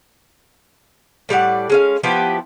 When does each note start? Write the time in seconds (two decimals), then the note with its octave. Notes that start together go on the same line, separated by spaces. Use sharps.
1.29 A2 G3 D5 F#5
1.70 G#3 C#4 F5
2.04 F3 B3 E4 G4